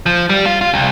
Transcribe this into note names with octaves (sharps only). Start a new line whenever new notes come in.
F3
G3
F4
F4
C2